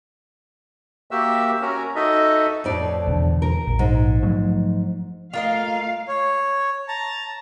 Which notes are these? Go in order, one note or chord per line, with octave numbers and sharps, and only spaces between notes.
A#3 F#4 G4 E5 E6
C#4 F#4 A#4
D#4 F#4 A4 D#5 E5
F2 A2 D5
E2 B2 D3
A#4
A#1
A#1 G#2
F3 F#3 A3
A3 F4 A#4 D#5 F5
C#5
A5 A#5